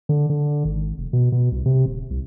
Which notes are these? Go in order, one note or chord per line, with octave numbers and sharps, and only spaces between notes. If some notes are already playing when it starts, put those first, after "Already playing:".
D3
D3
G#1
F1
B2
B2
C2
C3
D#1
C2